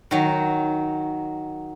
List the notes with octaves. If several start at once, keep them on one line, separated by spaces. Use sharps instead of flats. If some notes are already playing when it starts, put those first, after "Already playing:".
D#3 F#3